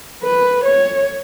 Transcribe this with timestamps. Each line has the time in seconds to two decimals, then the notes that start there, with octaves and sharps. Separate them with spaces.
0.23 B4
0.64 C#5